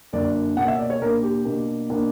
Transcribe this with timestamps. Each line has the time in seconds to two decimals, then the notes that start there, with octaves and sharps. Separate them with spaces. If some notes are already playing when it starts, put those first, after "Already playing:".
0.13 F#2 D3 A#3 D4 D5
0.57 B2 A#3 C#4 F#5
0.68 E5
0.79 D5
0.90 C#5
1.01 A#2 A#3 D4 A#4
1.23 G4
1.45 B2 A#3 D4
1.90 B2 A#3 D4